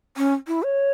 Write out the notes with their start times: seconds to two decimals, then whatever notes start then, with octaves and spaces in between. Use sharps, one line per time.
0.17 C#4
0.48 E4
0.63 C#5